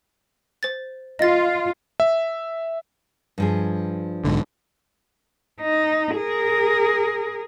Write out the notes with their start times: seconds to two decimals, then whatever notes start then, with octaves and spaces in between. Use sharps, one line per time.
0.63 C5 A6
1.19 F4 D#5 A6
2.00 E5
3.38 G2 F3 G#4
4.25 B1 G#2 D3
5.61 D#4
6.16 G#4 A#4